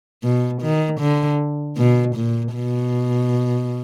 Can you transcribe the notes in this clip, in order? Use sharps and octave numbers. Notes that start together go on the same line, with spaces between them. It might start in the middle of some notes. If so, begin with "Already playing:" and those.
B2
D#3
D3
B2
A#2
B2